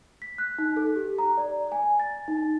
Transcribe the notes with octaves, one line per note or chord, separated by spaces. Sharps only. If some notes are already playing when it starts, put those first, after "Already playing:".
B6
F#6
D#4
A4
G4
A#5
D5
G#5
A6
D#4